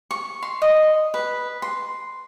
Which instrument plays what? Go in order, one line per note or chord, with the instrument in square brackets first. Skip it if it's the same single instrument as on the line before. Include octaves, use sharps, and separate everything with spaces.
[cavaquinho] C#6
C6
D#5
B4
C6